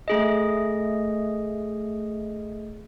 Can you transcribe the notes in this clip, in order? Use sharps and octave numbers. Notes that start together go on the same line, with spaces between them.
A3 G#4 D#5